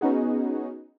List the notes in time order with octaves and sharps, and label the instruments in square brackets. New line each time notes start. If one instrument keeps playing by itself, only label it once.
[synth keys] B3 C#4 D#4 F#4 G#4